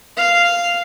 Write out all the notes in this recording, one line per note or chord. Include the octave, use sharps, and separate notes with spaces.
F5